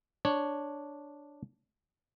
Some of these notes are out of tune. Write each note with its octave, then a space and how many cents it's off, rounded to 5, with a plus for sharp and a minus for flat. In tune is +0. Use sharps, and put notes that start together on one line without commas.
D4 +0 C#5 +0